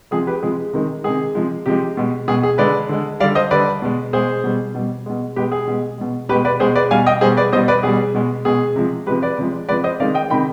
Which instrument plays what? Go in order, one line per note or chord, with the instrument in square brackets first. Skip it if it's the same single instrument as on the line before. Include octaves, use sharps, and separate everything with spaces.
[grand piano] C3 F3 G#3 G#4
G4 B4
C3 F3 G#3 G#4
C3 D#3 G#3
C3 D#3 G#3 G#4
C3 F3 G#3
C3 F3 G#3 G4
B2 G#3
B2 G#3 G#4
G#4
D3 G#3 B4 D5
D3 G#3
D3 G3 D5 F5
C5 D#5
D3 G3 B4 D5
B2 G#3
B2 G#3 G#4 C5
B2 G3
B2 G3
B2 G#3
B2 G#3 G4 B4
G#4
B2 G#3
B2 G#3
B2 G4 B4
G#3
B4 D5
B2 G#3 G#4 C5
B4 D5
B2 G3 F5 G#5
D#5 G5
B2 G3 G#4 C5
B4 D5
B2 C5 D#5
G3
B4 D5
B2 G3 G#4
B2 G#3
B2 G#3 G#4
C3 F3 G#3
C3 F3 G#3 G4 B4
B4 D5
C3 F3 G#3
C3 F3 G#3 B4 D5
C5 D#5
C3 D#3 G#3 D5 F5
D#5 G5
C3 D#3 G#3 G5 B5